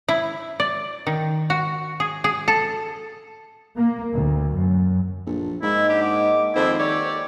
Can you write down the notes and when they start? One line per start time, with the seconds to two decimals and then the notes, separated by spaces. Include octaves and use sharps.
0.08 E4
0.60 D5
1.07 D#3
1.50 F#4
2.00 G#4
2.24 G#4
2.48 A4
3.76 A#3
4.14 D2
4.55 F#2
5.27 A#1 A4
5.62 G#2 A#3 D#4 E4
5.89 D4 G4 F#5
6.01 G#3 D#4 F#4 D6
6.55 F2 D#3 E4 C5
6.79 G4 A4 C#5 D5